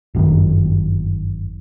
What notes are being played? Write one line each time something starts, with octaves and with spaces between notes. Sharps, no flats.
G1 F#2 D3 D#3